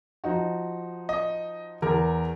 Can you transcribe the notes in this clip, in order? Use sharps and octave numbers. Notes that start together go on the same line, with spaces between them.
F3 D#4 F#4
D#5
E2 A#4